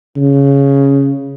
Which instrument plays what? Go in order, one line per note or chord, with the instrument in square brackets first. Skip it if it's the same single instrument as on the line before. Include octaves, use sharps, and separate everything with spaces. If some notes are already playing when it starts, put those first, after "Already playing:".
[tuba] C#3